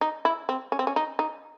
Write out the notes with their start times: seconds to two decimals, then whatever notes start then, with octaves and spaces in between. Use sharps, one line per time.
0.01 D#4
0.25 E4
0.49 C4
0.72 C#4
0.79 C4
0.87 C#4
0.96 D#4
1.19 D#4